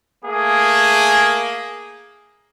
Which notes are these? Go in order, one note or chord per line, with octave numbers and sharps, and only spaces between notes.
A3 A#3 G#4